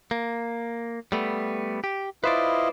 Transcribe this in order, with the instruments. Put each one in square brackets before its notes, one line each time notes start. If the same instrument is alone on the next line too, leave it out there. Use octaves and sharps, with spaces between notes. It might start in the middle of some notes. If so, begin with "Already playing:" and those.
[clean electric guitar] A#3
G3 A3 B3
G4
[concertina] E4 F4 D#5 [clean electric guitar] B4 C5 D5